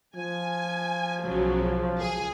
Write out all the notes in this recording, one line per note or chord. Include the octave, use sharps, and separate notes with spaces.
F3 G#5
B1 C#3 F#3
C#2 G#4 G#5